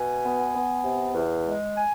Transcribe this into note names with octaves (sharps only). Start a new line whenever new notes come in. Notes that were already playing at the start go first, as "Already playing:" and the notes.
Already playing: B2 G#5
B3
B3
C3
E2
G#3
G#5